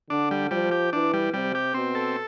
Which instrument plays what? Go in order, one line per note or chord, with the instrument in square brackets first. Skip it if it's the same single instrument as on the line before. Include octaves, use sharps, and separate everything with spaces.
[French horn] D3 [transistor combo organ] D4
[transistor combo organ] G3
[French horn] F3 [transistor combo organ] G3
[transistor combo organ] G4
[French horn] E3 [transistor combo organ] D4
[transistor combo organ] G3
[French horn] C3 [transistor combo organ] G3
[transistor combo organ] G4
[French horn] B2 [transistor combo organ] C4
[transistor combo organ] A4